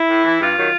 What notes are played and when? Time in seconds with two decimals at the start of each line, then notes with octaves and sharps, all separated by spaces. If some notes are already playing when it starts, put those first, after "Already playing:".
Already playing: E4
0.08 A2
0.24 E3
0.40 G2 F4
0.56 D#3 F#3